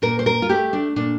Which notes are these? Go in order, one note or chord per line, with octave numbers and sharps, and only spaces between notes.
A#2 A#4
C5
A#4
F4
A3 G4
D4
A#2 D4